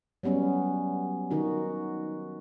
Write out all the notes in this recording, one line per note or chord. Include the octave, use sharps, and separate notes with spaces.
F#3 G3 B3 C#4
D#3 D#4 F#4